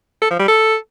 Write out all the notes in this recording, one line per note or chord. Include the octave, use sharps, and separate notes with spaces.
A4
F3
G3
A4